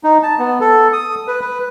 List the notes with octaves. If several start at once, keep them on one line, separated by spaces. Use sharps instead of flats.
D#4
A5
B3
A4
D#6
B4
B4